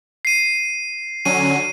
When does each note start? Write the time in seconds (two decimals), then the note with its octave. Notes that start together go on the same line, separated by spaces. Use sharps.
0.25 C7 D#7
1.25 D3 F#3 C#4 D#7